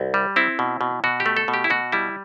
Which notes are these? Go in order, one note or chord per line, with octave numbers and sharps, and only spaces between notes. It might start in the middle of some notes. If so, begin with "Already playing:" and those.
Already playing: C2
G3
C4 E4
B2
B2
B2 F#4
G4
A3
A4
B2
G4
E4
B2 F#4
G3 E4